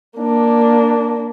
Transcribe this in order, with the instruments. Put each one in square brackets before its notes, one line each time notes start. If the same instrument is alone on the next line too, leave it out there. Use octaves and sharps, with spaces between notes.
[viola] A#3 D4